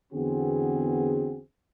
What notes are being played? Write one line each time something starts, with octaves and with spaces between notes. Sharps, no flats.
E2 D3 B3 C4 F#4 G#4